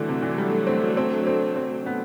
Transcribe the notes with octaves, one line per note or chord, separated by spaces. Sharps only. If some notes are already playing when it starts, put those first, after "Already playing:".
Already playing: D3 E3 F#3 A3 D4
C3
E3
G3
C4
C4
C4
C4
B3